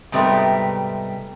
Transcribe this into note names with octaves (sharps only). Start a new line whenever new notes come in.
G#2 C3 G3 A3 B3 A#4